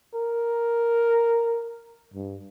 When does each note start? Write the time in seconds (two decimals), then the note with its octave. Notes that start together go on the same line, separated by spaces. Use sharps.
0.14 A#4
2.14 G2